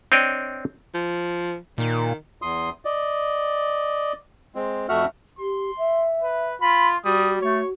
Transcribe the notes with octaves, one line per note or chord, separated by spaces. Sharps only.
C4 D4 C#5 D#5 G5
F3
A#2 D#3
E2 C6 D#6
D5 D#5
G#3 C4
F2 A3 F#4 E5 F#5 F6
G4 C6
E5
B4
F4 B5 C6
G3 F#4 D#6
A3 C#5